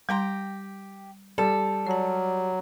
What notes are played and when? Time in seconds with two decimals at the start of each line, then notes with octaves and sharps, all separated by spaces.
0.09 G3 G4 G5 A#5 C6
1.38 G3 A4
1.87 F#3 D5 A5